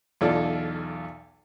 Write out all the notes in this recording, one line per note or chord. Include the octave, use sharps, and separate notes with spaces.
B1 E2 F4 A4 D5